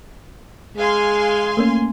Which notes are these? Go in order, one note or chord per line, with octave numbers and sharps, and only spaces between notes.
G#3 F5 G#5 C6
A3 A#3 C#4